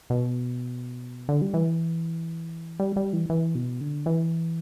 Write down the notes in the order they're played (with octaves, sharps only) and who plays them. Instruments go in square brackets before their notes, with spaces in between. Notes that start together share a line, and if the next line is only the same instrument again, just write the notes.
[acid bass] B2
D3
G3
E3
G3
G3
E3
E3
B2
D3
E3